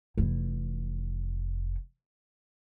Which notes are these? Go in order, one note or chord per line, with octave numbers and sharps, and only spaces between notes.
F1 E3